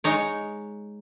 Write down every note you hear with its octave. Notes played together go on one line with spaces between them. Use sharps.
G#3 D#4 C#5